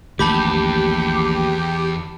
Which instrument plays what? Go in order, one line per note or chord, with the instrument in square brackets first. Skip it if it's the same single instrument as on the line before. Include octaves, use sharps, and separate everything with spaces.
[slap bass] A#1 D#3 A3 [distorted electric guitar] E2 [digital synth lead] G4 [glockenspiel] A5 B5 D6